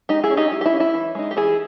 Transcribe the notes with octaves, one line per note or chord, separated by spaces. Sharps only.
G#3 D#4 G4
E4 G#4
C#4
D#4 G4
G#3 E4
G4
E4
C#4
E4
E3
G#3 D#4
G4
E3 E4 G#4